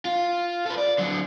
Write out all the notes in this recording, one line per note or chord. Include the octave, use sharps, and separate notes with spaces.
F4
A4 B4
D5
D3 F#3